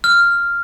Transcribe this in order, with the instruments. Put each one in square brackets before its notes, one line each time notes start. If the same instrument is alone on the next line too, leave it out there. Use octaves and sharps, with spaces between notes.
[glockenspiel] F6